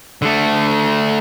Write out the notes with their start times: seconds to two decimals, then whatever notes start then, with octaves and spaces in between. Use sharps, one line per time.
0.22 D3 A3